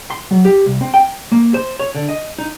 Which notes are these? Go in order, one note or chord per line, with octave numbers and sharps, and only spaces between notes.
C6
F#3
G4
C2
C4
G5
A#3
C5
C#5
D3
D#5
D#4